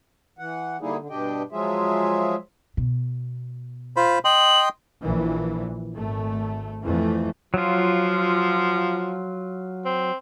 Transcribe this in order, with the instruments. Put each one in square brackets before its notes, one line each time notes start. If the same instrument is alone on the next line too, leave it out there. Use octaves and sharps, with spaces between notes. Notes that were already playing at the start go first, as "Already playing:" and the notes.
[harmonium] E3 F#5
D3 G3 A#3 D#4 E4 G#4
D3
G2 B2 D4 G4 D#5 G5
F3 F#3 G#3 F4 G#4 E5
[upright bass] B2
[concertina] F4 C5 B5
[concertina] D#5 G5 C6 [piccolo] F#7
[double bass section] A#1 E3
G#1 A3
F2 E3 A3
[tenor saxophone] F3 [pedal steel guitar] F#3 F4
[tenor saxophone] C4